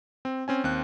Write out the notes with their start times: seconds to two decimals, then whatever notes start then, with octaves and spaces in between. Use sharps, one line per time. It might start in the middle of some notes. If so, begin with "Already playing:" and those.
0.25 C4
0.48 C4 C#4 G#5
0.64 D#2 C4 F#6